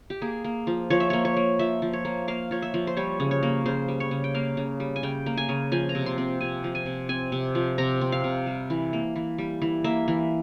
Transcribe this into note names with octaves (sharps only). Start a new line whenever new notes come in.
G4
A#3 G#4
A#3
F3
F3 C#5
E5
A#3 C#5
C#5
A#3
F3 E5
F3
C#5
A#3
A#3 F5
F3 C#5
E5
F3
C5
G3 C#5
C#3
C#5
A#3
C#3 C5
G3
C#5
C#3
G5
A#3 F5
C#3
G3
G#5
C#3 G5
A#3
G#5
C#3
F3 G#5
A#5
C3
C6
C4
C3 G#5
F3
G#5
C3
C4 G#5
C3
F3
C3 A#5
C4
F5
C3
G3
E3
A#3
E3
G3
E3
A#3 E5
E3